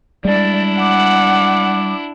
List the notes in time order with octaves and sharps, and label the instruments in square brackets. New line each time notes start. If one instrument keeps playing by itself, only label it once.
[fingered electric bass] G3 G#3 [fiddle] D4 E4 [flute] D5
[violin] F#5 [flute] D6